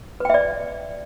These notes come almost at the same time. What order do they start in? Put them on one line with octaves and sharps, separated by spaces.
B4 G5 E5 D5